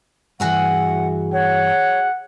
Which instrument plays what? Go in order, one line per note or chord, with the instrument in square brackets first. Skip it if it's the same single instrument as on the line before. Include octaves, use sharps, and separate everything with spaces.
[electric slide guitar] G2 E3 [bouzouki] F#4 G#4 E5 [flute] F#5
[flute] C#5 [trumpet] F#5